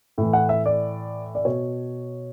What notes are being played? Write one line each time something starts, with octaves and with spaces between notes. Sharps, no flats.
A2 E3
F#5
E5
D5
D5
B2 C#5